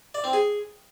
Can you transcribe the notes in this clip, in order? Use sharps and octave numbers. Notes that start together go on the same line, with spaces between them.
D5
C4
G#4